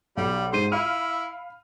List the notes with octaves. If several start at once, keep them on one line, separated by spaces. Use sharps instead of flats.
B1 G3
G#2 C5 D#7
E4 F5 B5 F6